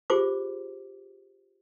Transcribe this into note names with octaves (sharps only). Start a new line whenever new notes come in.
F4 G4 G#4 C5 D6